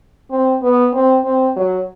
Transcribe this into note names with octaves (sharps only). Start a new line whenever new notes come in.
C4
B3
C4
C4
F#3